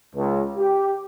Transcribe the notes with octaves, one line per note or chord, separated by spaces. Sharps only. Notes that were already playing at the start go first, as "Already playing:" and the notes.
C#2
G4